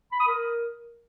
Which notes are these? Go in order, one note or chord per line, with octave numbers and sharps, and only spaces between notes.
B5
D#6
A#4